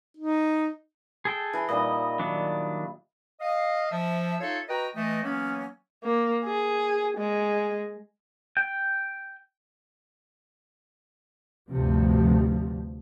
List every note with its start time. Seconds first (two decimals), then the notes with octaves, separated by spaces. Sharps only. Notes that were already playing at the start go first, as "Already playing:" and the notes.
0.17 D#4
1.25 G#4 A4 G5
1.53 E3 G#5
1.69 A#2 G3 D#4 D#5
2.19 D#3 F#3 D4
3.40 D#5 F5
3.91 F3 E5
4.41 D#4 F4 A4 C#5 E5 F5
4.69 F#4 B4 D#5 G5 A#5
4.95 E3 A3 D#5
5.24 E3 F#3 A#3 B3 C#4
6.04 A#3
6.45 G#4
7.18 G#3
8.57 G5
11.70 D2 G2 C3 F3